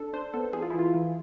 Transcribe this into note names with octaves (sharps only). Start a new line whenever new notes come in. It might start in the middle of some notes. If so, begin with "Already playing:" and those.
Already playing: D4 A4
D4 C5
B3 A4
E3 G#4
F4
E3 E4
F4
E3